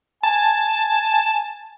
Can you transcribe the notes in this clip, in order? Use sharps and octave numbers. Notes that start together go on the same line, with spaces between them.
G#5 A5